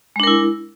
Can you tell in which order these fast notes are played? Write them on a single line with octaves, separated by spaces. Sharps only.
G#3 D4 A#4 E4